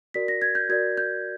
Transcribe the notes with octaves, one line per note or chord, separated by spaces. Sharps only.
F#4 A#4 D5 B6
A#6
G#6
G6
F#4 A#4 D5 G#6
G6